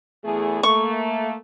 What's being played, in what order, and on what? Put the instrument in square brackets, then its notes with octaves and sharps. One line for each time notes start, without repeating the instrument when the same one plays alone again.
[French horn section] E2 A3 G#4
[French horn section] A3 A#3 [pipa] C#6